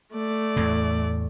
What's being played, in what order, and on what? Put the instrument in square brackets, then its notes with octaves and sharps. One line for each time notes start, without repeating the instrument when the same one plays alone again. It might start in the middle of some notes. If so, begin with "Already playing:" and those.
[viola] A3 D5
[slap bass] E2 A2